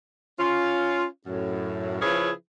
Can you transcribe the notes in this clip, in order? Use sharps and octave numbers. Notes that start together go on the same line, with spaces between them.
C#4 F4
F#2 A2
C#3 F3 C#4 E4 G#4 B4